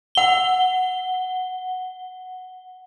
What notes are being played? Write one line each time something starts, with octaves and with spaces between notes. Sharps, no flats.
F#5 G7